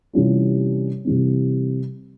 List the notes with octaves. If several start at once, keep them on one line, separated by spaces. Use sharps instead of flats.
C3 E3 G3 C#4 F4
C3 E3 G3 C4